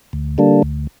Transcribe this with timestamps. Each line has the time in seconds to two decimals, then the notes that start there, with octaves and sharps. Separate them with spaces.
0.13 D2
0.38 D3 G3 A#3 D4
0.62 D2